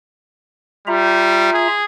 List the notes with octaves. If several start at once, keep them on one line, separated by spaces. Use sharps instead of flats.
G3 F4 E5 A#5
G#4